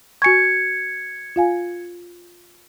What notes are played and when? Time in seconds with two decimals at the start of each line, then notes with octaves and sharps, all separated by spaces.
0.22 F#4 G#5 C#6 G#6 C#7
1.36 F4 F5 G#5